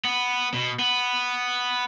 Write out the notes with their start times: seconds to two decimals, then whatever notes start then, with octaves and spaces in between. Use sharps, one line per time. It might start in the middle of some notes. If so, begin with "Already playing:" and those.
0.05 B3
0.54 B2
0.79 B3